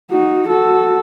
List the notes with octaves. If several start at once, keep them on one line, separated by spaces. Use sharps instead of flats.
D#4 F#4
F#4 A4